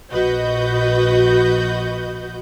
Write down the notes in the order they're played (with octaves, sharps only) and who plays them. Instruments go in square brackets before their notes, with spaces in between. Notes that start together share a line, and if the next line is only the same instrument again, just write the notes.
[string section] A#1 F#4 B4 D#5 G6